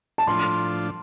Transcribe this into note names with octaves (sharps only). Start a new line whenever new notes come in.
A5
A2 F3 D4 F4 C6